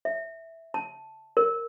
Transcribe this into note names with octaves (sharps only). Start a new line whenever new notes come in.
E5
A5
A#4